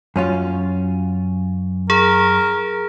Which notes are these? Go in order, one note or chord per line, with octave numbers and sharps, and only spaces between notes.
F#2 C#4 F4
G#4 A#4